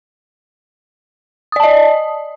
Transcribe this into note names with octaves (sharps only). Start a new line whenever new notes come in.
D5 D#5 A5 D#6